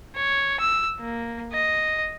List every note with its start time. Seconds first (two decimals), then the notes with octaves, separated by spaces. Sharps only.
0.17 C#5
0.60 E6
1.00 A#3
1.53 D#5